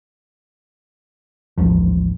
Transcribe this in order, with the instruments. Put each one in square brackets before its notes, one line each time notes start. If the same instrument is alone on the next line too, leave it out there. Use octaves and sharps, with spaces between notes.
[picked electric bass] A1 D#2 G#2 F3